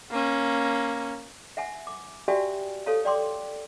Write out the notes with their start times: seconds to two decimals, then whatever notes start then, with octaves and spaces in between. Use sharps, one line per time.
0.10 A#3 C#4
1.57 E5 F#5 G#5
1.87 D6
2.28 F#4 G4 D5 E5 G5 G#5
2.86 A4 C#5 F5 A5
3.05 D5 G5 C6 D6